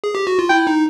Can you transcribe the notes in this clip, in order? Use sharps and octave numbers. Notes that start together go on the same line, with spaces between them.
G#4
G4
F#4
F4
E4 G5
D#4